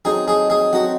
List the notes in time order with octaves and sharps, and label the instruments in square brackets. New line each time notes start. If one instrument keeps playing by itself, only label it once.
[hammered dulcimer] F#3 C4 D#4 A4 [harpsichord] G#4
[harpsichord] G#4
G#4
[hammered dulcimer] F#3 C4 D#4 A4 [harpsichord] F#4